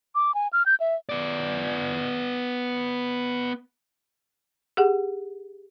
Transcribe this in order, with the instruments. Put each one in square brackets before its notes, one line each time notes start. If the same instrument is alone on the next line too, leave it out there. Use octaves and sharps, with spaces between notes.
[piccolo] D6
G#5
F6
G6
E5
[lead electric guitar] B3 D5
[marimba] G4 G#4 F#5